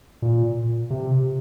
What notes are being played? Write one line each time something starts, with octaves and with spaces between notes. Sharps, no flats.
A#2
C3